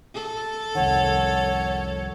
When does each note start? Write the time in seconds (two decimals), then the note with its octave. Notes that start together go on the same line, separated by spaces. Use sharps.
0.14 A4
0.75 C2 F2 D#3 C#5 F#5